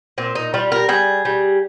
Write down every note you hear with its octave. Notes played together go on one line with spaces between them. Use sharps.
A#2 C4
D#4
G3 F4
A#4
G3 G#4
G3